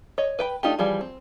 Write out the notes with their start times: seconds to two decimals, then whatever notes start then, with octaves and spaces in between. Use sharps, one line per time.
0.18 C#5 D#5
0.39 B4 G5 B5
0.63 A3 D4 D#4 F4 G4
0.79 E3 F3 G3 F4 G#4
1.01 C4